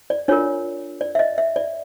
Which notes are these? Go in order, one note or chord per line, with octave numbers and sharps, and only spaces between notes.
D5
D4 F4 A#4 C#5
D5
E5
D#5
E5
D5